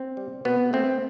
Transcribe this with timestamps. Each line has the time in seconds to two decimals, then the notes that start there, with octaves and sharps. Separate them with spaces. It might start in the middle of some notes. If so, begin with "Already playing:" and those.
Already playing: C4
0.17 G3
0.45 B2 B3
0.73 A3 C4